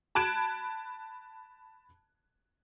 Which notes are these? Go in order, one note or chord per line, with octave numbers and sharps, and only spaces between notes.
A5 B5 F#6 G#6 D7 E7